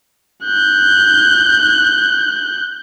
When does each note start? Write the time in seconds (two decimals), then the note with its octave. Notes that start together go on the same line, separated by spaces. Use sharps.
0.45 F#6 G6